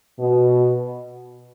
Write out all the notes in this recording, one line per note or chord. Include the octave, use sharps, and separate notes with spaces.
B2